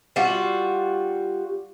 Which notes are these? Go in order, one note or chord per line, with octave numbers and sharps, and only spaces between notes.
G3 F4 F#4